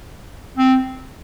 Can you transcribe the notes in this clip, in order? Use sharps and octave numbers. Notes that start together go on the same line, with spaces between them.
C4